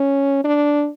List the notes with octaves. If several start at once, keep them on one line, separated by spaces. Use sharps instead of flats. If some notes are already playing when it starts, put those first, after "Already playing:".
Already playing: C#4
D4